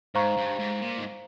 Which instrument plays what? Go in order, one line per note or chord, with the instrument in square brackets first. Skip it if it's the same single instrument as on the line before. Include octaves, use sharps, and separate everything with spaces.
[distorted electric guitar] G#2 [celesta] C5 F5 A#5 C#6
[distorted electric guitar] G2
G#2
A#2
G#2